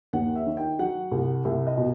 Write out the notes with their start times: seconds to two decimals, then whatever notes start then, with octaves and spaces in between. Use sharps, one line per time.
0.13 D#2 F#5
0.36 E5
0.46 D#3
0.57 G5
0.79 F#3 F#5
1.11 C2
1.45 C2 E5
1.67 D#5
1.78 B2